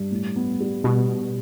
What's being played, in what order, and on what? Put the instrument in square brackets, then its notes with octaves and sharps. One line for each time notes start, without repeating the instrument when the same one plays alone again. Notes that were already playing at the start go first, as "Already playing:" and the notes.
Already playing: [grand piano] G2
A2
B3
G3
[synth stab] B2 [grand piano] G3